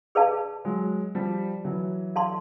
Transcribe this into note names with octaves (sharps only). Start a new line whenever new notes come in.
G#4 B4 D5 F5 A5
F#3 G#3
F3 G3
E3 F#3
A4 D5 F5 A5 C6